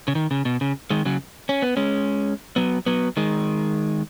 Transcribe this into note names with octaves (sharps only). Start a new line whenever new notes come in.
C#3
D#3
C#3
B2
C#3
D#3 G#3
C#3 F#3
C#4
B3
G#3 C#4
F#3 B3
F#3 B3
D#3 G#3